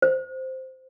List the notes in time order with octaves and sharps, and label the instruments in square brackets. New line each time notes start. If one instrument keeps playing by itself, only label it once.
[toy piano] C5